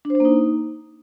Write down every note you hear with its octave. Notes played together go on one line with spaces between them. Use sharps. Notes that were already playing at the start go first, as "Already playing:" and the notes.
D4
C5
D4
A#3
D#4